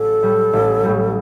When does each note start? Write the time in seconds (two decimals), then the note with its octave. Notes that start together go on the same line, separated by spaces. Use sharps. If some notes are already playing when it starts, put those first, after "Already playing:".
Already playing: A1 A4
0.22 A2 G3
0.53 A1
0.84 A2 G3